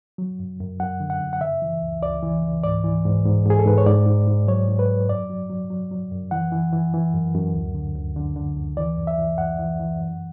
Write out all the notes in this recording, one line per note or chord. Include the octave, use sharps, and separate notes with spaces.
F#3
F#2
F#2
F#2 F#5
D3
F#5
F#2
F#5
C#3 E5
E3
C#2
C#2 D5
E3
C#2
G#2 D5
E3
G#2
G#2
G#2 G#4
A4
G#2 B4
C#5
G#2 D5
G#2
G#2
F#3 C#5
G#2
B4
F#3
F#2 D5
F#3
F#3
F#3
F#3
F#2
E3 F#5
E3
E3
E3
F#2
F#2
D2
D3
D2
D3
D3
D2
E3 D5
F#2
E5
E3
F#2 F#5
E3
E3
F#2